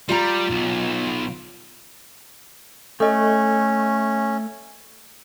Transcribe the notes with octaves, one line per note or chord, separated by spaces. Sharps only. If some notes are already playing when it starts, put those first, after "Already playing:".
G3 F4 F5 A#5
B1
A3 C#4 A4 D#5